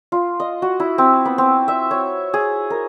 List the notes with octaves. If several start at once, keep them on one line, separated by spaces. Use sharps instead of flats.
F4
D#5
F#4
E4
C4
B3
C4
E5
C#5
G#4
A#4